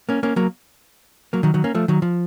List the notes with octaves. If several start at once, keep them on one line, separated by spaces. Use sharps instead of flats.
A#3 C#4
A#3 C#4
F#3 A#3
F#3 A#3
D#3 F#3
D#3 F#3
A#3 C#4
F3 A3
D#3 F#3
F3